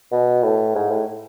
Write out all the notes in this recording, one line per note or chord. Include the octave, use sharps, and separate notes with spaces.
B2
A2
G#2
A2